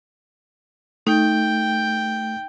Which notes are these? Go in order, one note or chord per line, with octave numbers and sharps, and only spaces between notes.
A3 D#4 G5